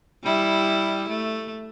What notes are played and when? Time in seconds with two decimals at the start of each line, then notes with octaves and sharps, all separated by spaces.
0.24 G3 E4
1.09 A3